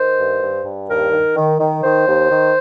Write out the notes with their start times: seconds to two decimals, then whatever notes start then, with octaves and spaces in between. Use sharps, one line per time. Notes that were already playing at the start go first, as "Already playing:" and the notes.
Already playing: D#3 C5
0.18 G2
0.41 G2
0.65 G2
0.88 D#2 A#4
1.12 D#3
1.36 D#3
1.59 D#3
1.83 D#3 C5
2.07 D#2
2.30 D#3